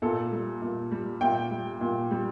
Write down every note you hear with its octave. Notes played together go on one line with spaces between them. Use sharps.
A#2 A4
G3
A#2
G3
A#2 G5
G3
A#2
G3